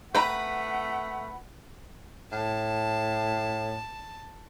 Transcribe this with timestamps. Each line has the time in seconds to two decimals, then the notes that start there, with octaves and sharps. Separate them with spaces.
0.15 A3 B4 F#5 G5 A#5 B5
2.32 A2 A5